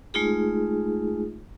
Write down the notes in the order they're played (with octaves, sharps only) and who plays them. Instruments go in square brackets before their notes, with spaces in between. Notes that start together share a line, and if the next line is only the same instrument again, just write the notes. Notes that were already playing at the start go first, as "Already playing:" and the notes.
[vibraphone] G#3 A3 D#4 F4 G#4